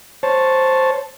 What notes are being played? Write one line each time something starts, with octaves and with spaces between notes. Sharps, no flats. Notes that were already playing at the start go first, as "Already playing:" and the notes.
C5 C#5 A5